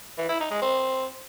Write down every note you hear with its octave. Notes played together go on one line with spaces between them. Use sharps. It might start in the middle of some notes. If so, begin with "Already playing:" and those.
E3
E4
D#4
G#3
C4